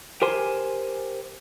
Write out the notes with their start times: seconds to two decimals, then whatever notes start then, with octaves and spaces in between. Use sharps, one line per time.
0.22 G4 A#4 C5 G#5 C6